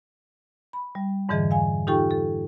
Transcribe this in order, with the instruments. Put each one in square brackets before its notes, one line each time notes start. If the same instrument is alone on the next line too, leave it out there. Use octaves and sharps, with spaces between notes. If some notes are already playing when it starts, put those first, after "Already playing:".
[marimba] B5
G3
F2 G#2 D3 E3 G#4 D#5
F5 G#5
D#4 F4 G4 A4 G5 C#6
A4